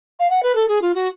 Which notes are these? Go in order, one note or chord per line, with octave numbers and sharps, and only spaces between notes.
F5
F#5
B4
A4
G#4
F4
F#4